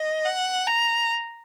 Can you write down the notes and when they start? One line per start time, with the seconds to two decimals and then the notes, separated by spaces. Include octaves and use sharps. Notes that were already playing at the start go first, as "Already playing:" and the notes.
Already playing: D#5
0.26 F#5
0.68 A#5